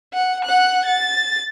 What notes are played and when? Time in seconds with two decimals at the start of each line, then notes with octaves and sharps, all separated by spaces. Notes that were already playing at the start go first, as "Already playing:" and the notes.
0.13 F#5
0.45 F#5 F#6
0.85 A6